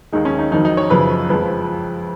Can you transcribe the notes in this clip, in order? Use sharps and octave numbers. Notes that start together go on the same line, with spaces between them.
D#2 D#3 G#3 D#4
C#4
D#4
F2 D#3 F#3 D#4
D#4
C#5
F#2 C#3 F3 B4
F2 F3 G#3 B4